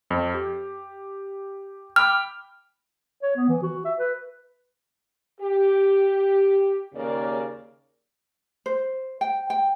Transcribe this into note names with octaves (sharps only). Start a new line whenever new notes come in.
F2
G4
G5 B5 D6 F6
C#5
B3
E3
F#4
E5
B4
G4
D#2 C#3 A#3 A#4 D5
C5
G5
G5